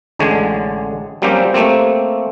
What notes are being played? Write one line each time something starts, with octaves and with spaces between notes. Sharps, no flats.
A1 D3 G#3 C#5
F#3 G3 A#3 C4 C#4 G4
A3 A#3 C4